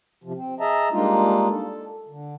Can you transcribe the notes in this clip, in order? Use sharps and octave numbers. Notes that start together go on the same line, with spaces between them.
C3 F3
C4
G#4 D#5 E5 A5 A#5
G3 G#3 A#3 D4 D#4 F4
A4
D3